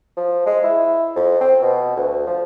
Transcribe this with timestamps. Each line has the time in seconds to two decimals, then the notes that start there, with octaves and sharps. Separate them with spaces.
0.17 F3
0.46 G#3
0.63 E4
1.16 F2
1.41 C4
1.62 B2
1.96 D2
2.27 F3